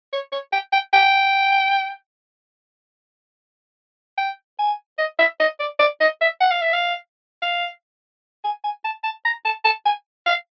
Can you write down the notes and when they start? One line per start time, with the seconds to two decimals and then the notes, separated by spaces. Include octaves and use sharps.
0.13 C#5
0.32 C#5
0.52 G5
0.73 G5
0.93 G5
4.18 G5
4.59 G#5
4.98 D#5
5.19 E5
5.40 D#5
5.60 D5
5.79 D5
6.01 D#5
6.21 E5
6.41 F#5
6.51 F5
6.61 E5
6.73 F5
7.42 F5
8.44 G#5
8.64 G#5
8.84 A5
9.04 A5
9.25 A#5
9.45 A5
9.65 A5
9.85 G#5
10.27 F5